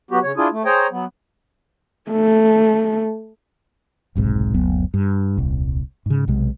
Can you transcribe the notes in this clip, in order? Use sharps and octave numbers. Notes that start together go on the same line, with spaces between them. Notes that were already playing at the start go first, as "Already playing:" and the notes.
F#3 B3 F#4 G4
C#3 C#5
D4 E4 F4 G#4
A3
G#4 C5 C#5 G5 A#5
F#3 B3
A3
F1 B1 G#2 C3
F#1 D2 F#3 B3
G2
D#1 C2
G#2 C#3
B1 C3 G#3